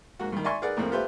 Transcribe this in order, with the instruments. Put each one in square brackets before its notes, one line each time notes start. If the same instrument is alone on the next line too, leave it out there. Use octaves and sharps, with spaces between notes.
[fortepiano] G#2 A#3 F#4
G2 D#3
D5 E5 G#5 C6 C#6
G#4 A#4 B4 D5 F#5
A#1 F2 A2 A#3 C4
F4 G4 A4 B4 C5 E5